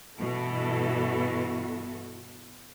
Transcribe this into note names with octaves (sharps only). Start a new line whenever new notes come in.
G2 B2 E3 E4 F#4 A4